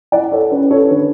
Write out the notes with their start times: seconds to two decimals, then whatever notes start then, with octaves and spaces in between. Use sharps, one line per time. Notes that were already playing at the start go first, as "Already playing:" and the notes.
0.12 E4 D5 F#5
0.32 A4 C#5
0.52 C#4 B4
0.71 A4 C#5
0.90 D3 B4